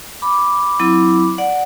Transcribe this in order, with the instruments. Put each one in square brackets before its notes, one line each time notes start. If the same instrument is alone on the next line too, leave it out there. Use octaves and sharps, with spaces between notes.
[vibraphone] B5 D6
F#3 C4 E4
D5 F#5